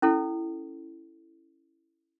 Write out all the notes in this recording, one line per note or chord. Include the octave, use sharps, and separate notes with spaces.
C#4 E4 A4